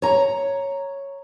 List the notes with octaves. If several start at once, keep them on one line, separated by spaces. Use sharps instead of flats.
C#5 A#5